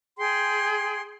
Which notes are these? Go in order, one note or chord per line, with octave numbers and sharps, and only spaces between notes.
G#4 G5 C6